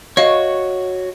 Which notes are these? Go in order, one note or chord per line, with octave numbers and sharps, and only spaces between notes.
F#4 C#5 D#5 F5 C#6